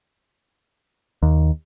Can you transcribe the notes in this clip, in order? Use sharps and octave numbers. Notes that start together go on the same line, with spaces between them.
D#2